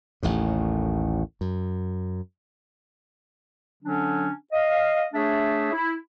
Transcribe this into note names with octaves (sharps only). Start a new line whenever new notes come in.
A1 D#2 A2
F#2
D3 F#3 C#4 D4
D#5 F5
A3 D4 G#4 C#5 E5
E4